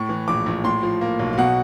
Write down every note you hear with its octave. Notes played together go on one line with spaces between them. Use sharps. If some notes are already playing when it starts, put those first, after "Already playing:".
Already playing: A2 C#6
E3
A#1 D6
A#1
A2 C6
F3
A#3
B1
F5
B2 F#5